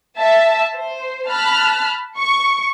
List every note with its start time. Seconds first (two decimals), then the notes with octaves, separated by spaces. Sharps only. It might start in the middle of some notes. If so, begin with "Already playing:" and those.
0.18 E5 A5
0.74 C5
1.29 A5 B5 F6 F#6
2.18 C#6